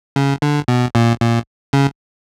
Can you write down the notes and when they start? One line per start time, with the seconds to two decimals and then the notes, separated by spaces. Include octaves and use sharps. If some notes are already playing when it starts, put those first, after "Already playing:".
0.16 C#3
0.42 D3
0.68 B2
0.95 A#2
1.21 A#2
1.73 C#3